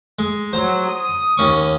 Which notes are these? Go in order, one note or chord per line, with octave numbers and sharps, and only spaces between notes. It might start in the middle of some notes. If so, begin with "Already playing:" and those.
G#3
F#3 C5 A#5
D#6
D#2 C#4 C#6